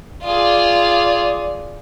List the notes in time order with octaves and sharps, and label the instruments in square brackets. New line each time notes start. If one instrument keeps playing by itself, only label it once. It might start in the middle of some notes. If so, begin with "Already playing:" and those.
[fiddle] F4 G#4 [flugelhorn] D5